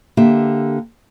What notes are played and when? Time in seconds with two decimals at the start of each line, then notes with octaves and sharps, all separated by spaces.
0.17 D3 A#3 G4 E5